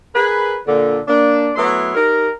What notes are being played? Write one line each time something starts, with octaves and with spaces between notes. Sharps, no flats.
G#4 A#4 B4
A#2 D3
A#3 D4
F#3 A3 B3 E4 C6
D#4 G4 A#4